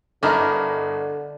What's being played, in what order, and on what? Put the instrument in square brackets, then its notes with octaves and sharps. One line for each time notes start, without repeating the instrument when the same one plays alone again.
[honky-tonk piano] G1 D#5 F6 [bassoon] D3 [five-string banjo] D4 E4 A#4